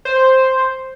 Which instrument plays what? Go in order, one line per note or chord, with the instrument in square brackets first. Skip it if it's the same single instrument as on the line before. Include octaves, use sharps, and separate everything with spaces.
[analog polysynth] C5